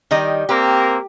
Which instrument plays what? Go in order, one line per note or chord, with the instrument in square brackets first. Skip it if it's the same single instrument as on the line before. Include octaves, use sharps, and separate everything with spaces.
[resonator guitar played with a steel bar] D#3 G3 D#5
[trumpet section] A#3 C4 A#4 [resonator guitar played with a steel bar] G4